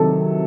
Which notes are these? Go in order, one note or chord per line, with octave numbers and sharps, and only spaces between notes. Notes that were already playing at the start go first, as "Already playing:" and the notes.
Already playing: C3 D#3 F#3 A4